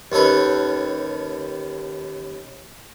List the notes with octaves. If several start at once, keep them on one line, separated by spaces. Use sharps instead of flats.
D#2 C#4 A4 B4